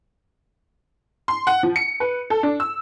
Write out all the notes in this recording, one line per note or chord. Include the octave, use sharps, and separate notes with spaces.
C6
F#5
F3
C#7
B4
A4
D4
E6